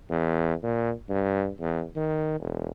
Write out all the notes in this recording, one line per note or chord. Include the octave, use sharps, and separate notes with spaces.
E2
A#2
G2
E2
D#3
E1